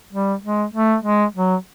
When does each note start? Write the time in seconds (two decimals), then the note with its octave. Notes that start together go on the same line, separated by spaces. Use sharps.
0.13 G3
0.44 G#3
0.74 A3
1.04 G#3
1.35 F#3